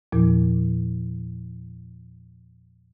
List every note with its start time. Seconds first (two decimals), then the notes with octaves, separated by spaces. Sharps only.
0.12 E2 A#2 F3